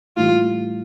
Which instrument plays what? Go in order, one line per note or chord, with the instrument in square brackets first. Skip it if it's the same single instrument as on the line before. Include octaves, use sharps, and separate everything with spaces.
[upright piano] A2 E3 G3 [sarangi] F4